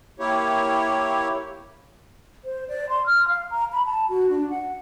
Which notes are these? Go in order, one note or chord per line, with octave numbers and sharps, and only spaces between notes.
A#3 E4 G4 C#5
C5
D5
C6
F6
F5
A#5
B5
A5
F#4
D4
F#5